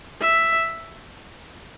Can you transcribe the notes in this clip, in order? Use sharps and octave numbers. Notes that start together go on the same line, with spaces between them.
E5